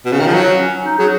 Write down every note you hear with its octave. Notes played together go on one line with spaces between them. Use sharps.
B2
C#3
D#3
F3
F#3
C#4
D#4
F#3 G#4